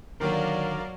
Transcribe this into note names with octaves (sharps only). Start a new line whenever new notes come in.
D3 D#3 F#3 A#3 A#4 D5 F5